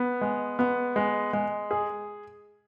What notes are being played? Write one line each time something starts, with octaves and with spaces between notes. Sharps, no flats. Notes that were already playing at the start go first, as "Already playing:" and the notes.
Already playing: B3
G#3
B3
G#3
G#3
G#4